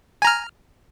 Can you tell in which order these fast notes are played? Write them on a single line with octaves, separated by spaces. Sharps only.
G#5 A#5 F6